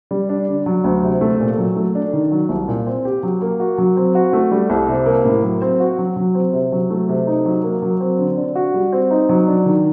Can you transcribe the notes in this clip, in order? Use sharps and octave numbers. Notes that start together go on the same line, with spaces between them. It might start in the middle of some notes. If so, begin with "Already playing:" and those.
G3
D4
D3
F#3
D2
C3
A3
A#2
F#3
A3
D4
D#3
F#3
C2
A#2
C4
G4
F#3
A#3
F#4
F#3
C4
F#4
A3
G3
C2
C3
A#3
A2
F#3
C4
F#4
F#3
F#3
C4
C3
F#3
A3
C3
D#4
F#3
A#3
F#3
C4
D3
D4
F#4
G3
C4
D#4
F#3
D4
D#3